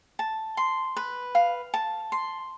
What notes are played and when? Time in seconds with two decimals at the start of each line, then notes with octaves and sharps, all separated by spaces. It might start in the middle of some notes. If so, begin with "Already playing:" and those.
0.19 A5
0.57 C6
0.96 B4
1.35 F5
1.74 A5
2.12 C6